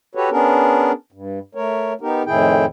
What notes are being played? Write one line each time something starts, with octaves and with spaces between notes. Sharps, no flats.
F#4 G4 A4 B4 C#5
B3 C#4 D4 G#4 A#4
G2
A3 A#4 C#5
B3 D#4 G4 A#4
F2 A2 D#3 E4 G#4 G5